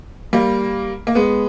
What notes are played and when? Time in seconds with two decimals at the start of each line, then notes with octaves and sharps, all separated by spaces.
0.33 G3 A#3
1.07 A#3
1.15 G#3 B3